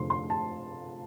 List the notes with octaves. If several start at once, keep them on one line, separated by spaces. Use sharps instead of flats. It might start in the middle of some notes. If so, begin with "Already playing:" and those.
Already playing: F1 F2 D3 F3 A3 C6
C6
A5